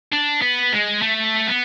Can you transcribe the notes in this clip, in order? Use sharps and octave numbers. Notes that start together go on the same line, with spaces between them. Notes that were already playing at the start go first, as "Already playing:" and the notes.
D4
B3
G#3
A3
B3